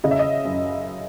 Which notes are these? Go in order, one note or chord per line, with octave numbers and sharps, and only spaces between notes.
C#3 D#5
E5
D#5
F#2